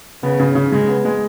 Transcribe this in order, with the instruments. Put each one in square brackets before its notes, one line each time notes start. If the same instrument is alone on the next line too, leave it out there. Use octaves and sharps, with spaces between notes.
[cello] C#3 [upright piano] B3
[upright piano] C#3
C#3
[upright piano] C#3 [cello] G#3
[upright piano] B3
G#3